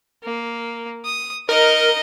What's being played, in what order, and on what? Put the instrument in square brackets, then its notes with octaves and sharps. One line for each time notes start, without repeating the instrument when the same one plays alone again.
[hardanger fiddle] A#3
D#6
[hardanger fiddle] D#4 D#5 [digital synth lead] A#4